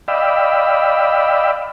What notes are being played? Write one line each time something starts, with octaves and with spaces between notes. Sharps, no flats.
D5 D#5 F5 G5 B5 E6